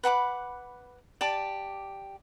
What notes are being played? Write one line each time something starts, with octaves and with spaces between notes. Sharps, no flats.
B4 F#5 B5 D6
G4 D5 A5 D6